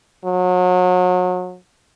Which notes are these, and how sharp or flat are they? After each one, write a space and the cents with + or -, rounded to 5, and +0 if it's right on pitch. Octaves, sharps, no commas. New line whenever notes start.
F#3 -35